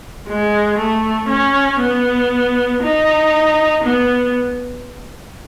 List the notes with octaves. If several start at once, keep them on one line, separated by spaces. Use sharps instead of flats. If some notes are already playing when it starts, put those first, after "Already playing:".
G#3
A3
C#4
B3
D#4
B3